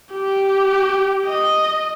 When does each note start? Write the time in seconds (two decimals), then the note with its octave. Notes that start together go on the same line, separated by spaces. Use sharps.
0.14 G4
1.27 D#5